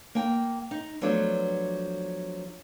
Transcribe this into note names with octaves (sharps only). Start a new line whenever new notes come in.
A#3 G5
D#4
F3 F#3 A3 B3 D4